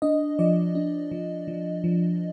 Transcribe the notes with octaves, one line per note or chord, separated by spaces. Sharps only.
D4 D#5
F3 D5
D4
F3
F3
F3